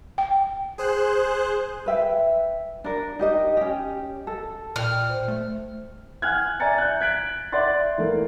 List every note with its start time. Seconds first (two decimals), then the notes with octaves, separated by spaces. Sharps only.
0.18 G5
0.78 G#4 C5 F#6
1.86 B4 E5 G5
2.84 D4 A#4
3.19 D#4 G4 D#5
3.57 C#4 G4
4.27 A4
4.76 A#2 D5 G5 F6
5.10 C5
5.28 A3
6.22 F#5 G#5 F6 F#6 G#6
6.60 D5 E5 G#5 A#5 A6 C#7
6.78 F#6 G6
7.01 F#6 G#6 B6 D7 F#7
7.52 D5 E5 F#5 C6 A6
7.98 E3 A3 A#3